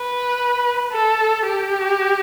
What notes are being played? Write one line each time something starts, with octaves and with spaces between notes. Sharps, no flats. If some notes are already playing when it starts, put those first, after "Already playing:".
Already playing: B4
A4
G4